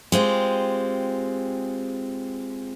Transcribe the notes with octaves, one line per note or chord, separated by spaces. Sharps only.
G#3 C4 F4 G4